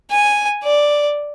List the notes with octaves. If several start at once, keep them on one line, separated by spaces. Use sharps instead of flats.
G#5
D5